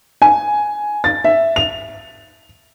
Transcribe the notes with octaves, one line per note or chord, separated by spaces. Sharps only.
G#5
A6
E5
F7